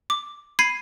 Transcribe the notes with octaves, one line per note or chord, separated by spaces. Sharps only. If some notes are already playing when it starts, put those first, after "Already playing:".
D6
B5 G#6 C7 D#7